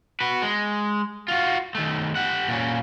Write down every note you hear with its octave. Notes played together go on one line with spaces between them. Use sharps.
F#4 B4
G#3
F4 F#4
D#3 A3
G4 F#5
A#2 C#4